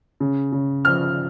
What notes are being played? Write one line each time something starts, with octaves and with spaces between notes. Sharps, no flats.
C#3
C#3
F3 F6